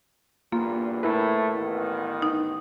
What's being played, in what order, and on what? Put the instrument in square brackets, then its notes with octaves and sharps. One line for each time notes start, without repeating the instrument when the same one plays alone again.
[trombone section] E2 G2 A#2 [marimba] A#3 [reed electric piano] F4
[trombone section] A2 A3 [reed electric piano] E4 A#4 B4
[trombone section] A1 D#3 B3
[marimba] D#4